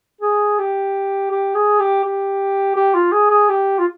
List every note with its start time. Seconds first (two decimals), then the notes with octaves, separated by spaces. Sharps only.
0.21 G#4
0.59 G4
1.31 G4
1.55 G#4
1.80 G4
2.04 G4
2.75 G4
2.94 F4
3.12 G#4
3.30 G#4
3.49 G4
3.79 F4